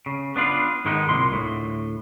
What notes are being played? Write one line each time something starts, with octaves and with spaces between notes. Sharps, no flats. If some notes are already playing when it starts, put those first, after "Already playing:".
C#3
B3 D4 F4 B4
G#2 D#3 G#3 B3 D#4
C2 A#2 C6
D2 A2